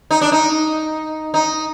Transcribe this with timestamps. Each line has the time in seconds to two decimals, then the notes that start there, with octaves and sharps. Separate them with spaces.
0.11 D#4
0.21 D4
0.32 D#4
1.34 D#4